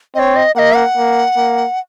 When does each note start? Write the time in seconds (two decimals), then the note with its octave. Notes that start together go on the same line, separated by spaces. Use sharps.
0.15 C4 C#5 D#5
0.36 D#5
0.56 A#3 D#5 F#5
0.75 F#5
0.97 A#3
1.36 A#3